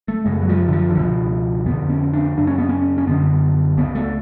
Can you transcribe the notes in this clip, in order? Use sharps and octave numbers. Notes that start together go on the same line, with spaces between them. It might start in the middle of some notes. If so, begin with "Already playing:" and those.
A3
F#2 C#3 G#3
F#3
F3
D3
F3
D3
C#2 B2 F3
F2 D3 B3
C#4
D4
F#2 C#3 D4
C#4
B3
C#4
C#4
F#2 D3 B3
C#2 C#3 B3
A3